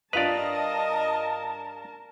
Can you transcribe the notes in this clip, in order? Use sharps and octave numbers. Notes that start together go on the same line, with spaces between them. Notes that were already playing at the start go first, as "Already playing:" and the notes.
G2 F4 A#4 B4 D5 D#5 A5 F7